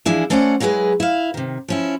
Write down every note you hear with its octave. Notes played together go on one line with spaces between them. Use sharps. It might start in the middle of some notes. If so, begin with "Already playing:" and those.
E3 F3 D4 E4 G#4
A3 C#4 C5 D5 F5 F#5
F#3 G#3 E4 G#4 B4
E4 F5
C3 D#3
F3 C#4 E4